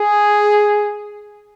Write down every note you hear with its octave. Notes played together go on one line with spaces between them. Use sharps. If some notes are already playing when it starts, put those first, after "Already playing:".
Already playing: G#4